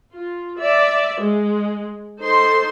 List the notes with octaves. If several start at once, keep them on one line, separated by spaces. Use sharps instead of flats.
F4
D5 E5
G#3
D#4 A4 C5 C6